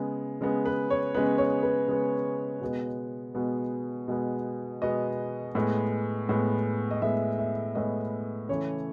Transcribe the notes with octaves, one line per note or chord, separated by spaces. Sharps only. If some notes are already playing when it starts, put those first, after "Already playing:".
Already playing: C#3 G#3 B3
C#3 G#3 B3
B4
C#5
C#3 G#3 B3 B4
C#5
B4
C#3 G#3 B3
B2 G#3 B3
B2 G#3 B3
B2 G#3 B3
B2 G#3 B3 D#5
A2 G#3 B3
A2 G#3 B3
D#5
A2 G#3 B3 E5
E5
A2 G#3 B3 D#5
C#3 E3 A3 C#5